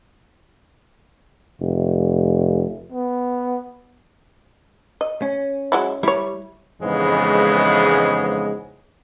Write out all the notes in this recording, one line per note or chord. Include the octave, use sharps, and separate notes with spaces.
F1
B3
D#5
C#4
F#3 G#3 E4
G3 E4 C#5
F2 G#2 C#3 E3 G#3 B3